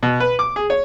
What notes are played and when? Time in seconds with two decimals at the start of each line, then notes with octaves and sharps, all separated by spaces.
0.03 B2
0.20 B4
0.39 D6
0.56 G#4
0.70 C#5